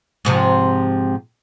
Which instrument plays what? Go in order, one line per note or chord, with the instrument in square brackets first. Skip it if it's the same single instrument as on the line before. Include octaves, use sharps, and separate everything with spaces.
[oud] G#2 C3 F3